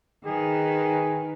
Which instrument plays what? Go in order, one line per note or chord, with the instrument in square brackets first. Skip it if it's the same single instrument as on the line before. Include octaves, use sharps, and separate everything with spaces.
[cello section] D#3 B4 [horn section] G#4